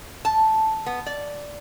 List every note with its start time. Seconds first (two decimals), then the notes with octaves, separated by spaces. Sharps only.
0.25 A5
0.86 B3
1.06 D5